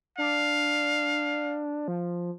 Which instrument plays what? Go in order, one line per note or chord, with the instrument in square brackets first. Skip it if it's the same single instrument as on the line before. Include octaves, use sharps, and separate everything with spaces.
[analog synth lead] D4 [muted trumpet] F5
[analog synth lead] F3